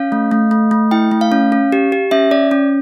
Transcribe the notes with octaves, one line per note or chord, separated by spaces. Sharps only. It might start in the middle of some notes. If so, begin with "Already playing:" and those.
Already playing: C#4 F5
A3
A3
A3
A3
E4 G5
A3
F5
C#4
C#4
G4
G4
C#4 E5
C#4 D5
C#4